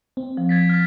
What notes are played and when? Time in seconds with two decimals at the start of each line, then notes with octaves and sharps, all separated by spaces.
0.17 C4
0.37 F3
0.49 G#6 A6 B6
0.69 F6 G#6 B6